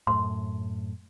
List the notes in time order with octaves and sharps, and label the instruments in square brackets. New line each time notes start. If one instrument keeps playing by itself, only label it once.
[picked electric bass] F#2 A2 [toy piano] C6